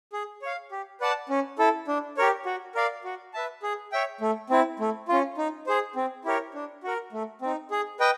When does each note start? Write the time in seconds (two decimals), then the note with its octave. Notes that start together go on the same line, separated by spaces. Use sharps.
0.13 G#4
0.42 C#5 F5
0.71 G4
1.01 B4 D5 F#5 A5
1.29 C#4
1.59 E4 A4
1.88 D4
2.17 G4 A#4 C#5
2.46 F#4
2.75 A#4 D5 F5
3.04 F#4
3.34 B4 E5 A5
3.63 G#4
3.92 C#5 E5 G5
4.21 A3
4.50 C4 E4
4.79 A3
5.08 C#4 F4
5.38 D#4
5.67 G#4 C5
5.96 C4
6.25 E4 G4 A#4 C#5
6.54 D4
6.83 F#4 A#4
7.13 A3
7.42 C4 D#4
7.71 G#4
8.00 B4 D#5 G5